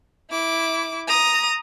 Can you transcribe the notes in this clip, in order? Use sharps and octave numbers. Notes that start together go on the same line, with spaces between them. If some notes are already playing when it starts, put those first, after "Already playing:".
E4 D6
A#5 D#6